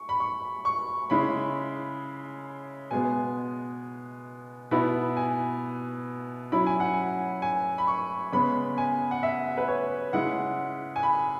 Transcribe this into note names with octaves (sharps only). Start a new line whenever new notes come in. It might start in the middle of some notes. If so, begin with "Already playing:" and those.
Already playing: C#6
B5
C#6
C#6
C#3 G#3 E4 B5
B2 G#3 B3 G#5
B2 B3 E4 B5
G#5
F#3 C#4 E4 B5
G#5
F#5
G#5
G#5
B5
C#6
C#3 G#3 B3 B5
G#5
F#5
E5
B4
C#5
C#3 G#3 E4 F#5
G#5
B5